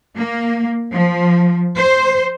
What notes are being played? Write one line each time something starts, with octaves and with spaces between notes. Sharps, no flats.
A#3
F3
C5